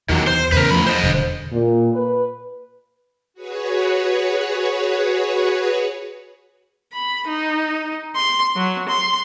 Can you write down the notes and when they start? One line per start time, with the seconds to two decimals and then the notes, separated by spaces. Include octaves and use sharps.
0.09 E2 D#3 F#3
0.27 C5
0.52 E2 C#3 A#4 B4
0.71 D2 F3 B5
0.87 C5 D#5
1.03 E1 D3
1.52 A#2
1.93 B4
3.34 F#4 G#4 B4 C#5
6.92 B5
7.27 D#4
8.16 C6
8.56 F#3
8.88 C6